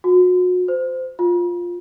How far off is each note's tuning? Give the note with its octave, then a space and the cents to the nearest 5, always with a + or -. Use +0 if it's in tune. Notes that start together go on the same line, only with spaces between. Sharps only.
F#4 -35
C5 -20
F4 +5